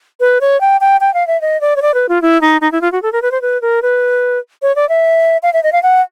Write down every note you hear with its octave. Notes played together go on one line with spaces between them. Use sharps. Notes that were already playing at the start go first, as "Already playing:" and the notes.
B4
C#5
G5
G5
G5
F5
E5
D#5
D5
C#5
D5
B4
F4
E4
D#4
D#4
E4
F4
F#4
A4
A#4
B4
C5
B4
A#4
B4
C#5
D5
E5
F5
E5
D#5
F5
F#5